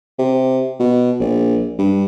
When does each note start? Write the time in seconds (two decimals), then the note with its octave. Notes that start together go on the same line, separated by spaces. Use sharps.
0.19 C3
0.80 B2
1.20 A#1
1.79 G2